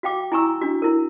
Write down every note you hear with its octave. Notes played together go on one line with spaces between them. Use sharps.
F#4 F5 G5 D6
E4 G#5 A#5 C#6 E6
D4 F#4
E4 A#4